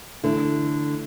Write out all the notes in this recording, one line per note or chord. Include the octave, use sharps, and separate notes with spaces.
D3 E3 A3 E4